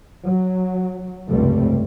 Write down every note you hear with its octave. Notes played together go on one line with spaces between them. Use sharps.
F#3
F1 C#2 G2 G3 A3 C4